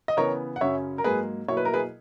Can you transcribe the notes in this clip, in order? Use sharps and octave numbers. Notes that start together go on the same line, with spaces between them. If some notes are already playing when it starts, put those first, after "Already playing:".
D#5
C#3 E3 B3 A#4 C#5
F#5
F#2 C#3 F#3 C#4 C#5 E5
A#4
G#2 F#3 A#3 G#4 B4
B2 F#3 A#3 E4 C#5
B4
A#4
G#4 B4